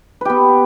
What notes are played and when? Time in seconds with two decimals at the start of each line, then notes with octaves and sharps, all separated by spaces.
0.21 B4
0.25 G4
0.30 B3